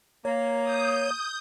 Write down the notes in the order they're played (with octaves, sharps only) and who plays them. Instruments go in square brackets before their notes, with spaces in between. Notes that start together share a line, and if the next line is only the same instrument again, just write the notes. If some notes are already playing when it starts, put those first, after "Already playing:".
[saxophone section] A#3 [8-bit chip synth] C#5
[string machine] D#6 G6